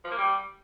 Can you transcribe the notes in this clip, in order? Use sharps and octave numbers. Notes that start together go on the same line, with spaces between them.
F3
A#3
G3